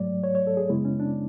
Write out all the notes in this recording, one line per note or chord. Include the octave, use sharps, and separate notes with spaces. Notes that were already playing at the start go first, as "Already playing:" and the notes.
Already playing: G#2 F#3 A3 D5
C#5
C#5
A4
G#4
F#2 C#3 G#3 B3 E4
C#4
D4